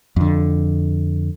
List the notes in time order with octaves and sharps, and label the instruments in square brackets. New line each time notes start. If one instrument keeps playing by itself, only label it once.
[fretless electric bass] F2 D3